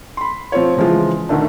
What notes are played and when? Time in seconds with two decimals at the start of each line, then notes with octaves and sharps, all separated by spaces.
0.17 B5 C6
0.52 F3 C4 F4 C#5
0.76 C#3 E3 F3 G#3 F4
1.29 D2 D#3 A3 D4